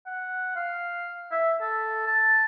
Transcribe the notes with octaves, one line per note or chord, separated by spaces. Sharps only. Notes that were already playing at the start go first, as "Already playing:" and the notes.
F#5
F5
E5
A4
A5